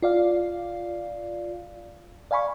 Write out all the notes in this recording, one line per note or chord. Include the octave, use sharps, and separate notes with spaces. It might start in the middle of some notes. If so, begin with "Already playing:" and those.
F4 D5 F5
D5 F5 G#5 B5 C#6